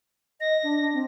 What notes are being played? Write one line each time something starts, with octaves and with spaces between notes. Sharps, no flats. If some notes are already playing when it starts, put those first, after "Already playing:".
D#5 A#6
D4
C4